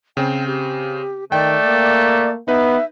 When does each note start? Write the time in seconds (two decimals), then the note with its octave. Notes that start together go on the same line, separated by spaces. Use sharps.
0.17 C#3 C4 C5 G5
0.47 G4
1.32 D#3 A3 D5 G5
1.63 A#3
2.48 B3 D#4 B4 E5